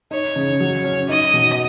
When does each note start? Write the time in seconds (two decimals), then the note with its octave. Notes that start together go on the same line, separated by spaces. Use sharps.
0.11 D#4 C#5
0.36 C#3
0.60 F#3
0.84 C#4
1.08 D#4 D#5
1.34 B2